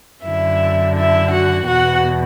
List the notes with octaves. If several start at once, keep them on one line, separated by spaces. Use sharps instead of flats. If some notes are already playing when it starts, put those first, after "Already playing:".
F#2 D3 E4 E5
E4 E5
F#4 F#5
E2 B2 F#4 F#5